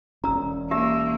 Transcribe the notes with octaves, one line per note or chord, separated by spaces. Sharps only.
E1 C#4 A#5 E6
A#3 D#4 G4 E5 E6